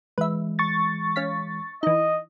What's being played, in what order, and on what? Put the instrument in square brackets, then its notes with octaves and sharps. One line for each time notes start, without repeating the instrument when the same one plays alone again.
[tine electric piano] E3 G#3 [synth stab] B4 E5
[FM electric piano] C#6 A6
[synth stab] C#4 F5 B6
[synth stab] E3 D#4 [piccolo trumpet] D#5